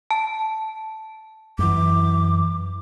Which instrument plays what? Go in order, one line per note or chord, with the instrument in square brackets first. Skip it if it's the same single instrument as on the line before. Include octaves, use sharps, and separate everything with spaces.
[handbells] A5
[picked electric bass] F#2 E3 [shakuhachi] D6